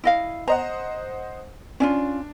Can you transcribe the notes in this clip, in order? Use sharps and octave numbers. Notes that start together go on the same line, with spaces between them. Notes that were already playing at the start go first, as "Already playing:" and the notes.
E4 D#5 F5
C5 D#5 F#5 A#5
C#4 D4 E4 F4